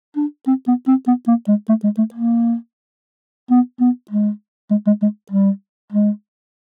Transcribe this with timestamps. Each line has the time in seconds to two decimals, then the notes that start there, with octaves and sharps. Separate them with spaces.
0.16 D4
0.47 C4
0.68 B3
0.88 C4
1.07 B3
1.28 A#3
1.48 G#3
1.69 A3
1.84 G#3
1.98 A3
2.14 A#3
3.51 B3
3.81 B3
4.11 G#3
4.71 G#3
4.87 G#3
5.02 G#3
5.32 G3
5.92 G#3